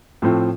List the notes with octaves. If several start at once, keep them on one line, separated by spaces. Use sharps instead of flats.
A2 F3 A3 C4